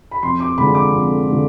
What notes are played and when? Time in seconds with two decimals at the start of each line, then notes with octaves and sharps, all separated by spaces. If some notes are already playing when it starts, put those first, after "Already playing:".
0.11 B5
0.23 F2 C6
0.40 D6
0.58 D3 G#3 D4 F4 B5
0.75 D6
0.92 F2
1.28 D3 G#3 D4 F4